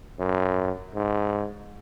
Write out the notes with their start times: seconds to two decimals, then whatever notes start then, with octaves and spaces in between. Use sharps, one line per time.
0.19 F#2
0.95 G#2